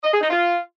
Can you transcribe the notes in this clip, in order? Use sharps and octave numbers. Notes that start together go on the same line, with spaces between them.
D#5
G#4
D#4
F4